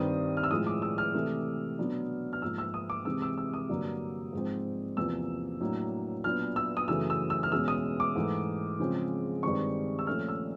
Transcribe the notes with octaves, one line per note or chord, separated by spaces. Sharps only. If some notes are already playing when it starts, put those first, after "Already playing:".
Already playing: G2 D#3 G3 C4 D#6
F6
E6
A2 F3 G#3 D#6
D6
E6
F6
C3 E3 A3
B2 F#3 B3 D4
F6
G#2 F3 A#3 E6
E6
D#6
D6
C3 E3 G#3 C4 E6
E6
E6
D#6
G2 D3 F#3 A#3
G#2 F3 G#3 C4
E2 C3 F3 A#3 E6
A2 F#3 A#3 D4
A#2 F#3 B3 D4 F6
E6
D#6
F#2 C#3 E3 A3 E6
E6
E6
F6
E2 B2 G#3 C#4 E6
D#6
D6
G#2 E3 A3
C#3 F3 G#3 C4
G2 D#3 G#3 C4 C#6
E6
A#2 F3 A3 C#4 F6
E6